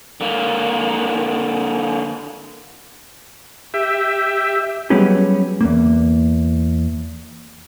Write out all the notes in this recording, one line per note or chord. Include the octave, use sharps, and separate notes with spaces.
D3 A#3
G4 E5
F#3 G3 B3 C#4 G4 G#4
E2 A#3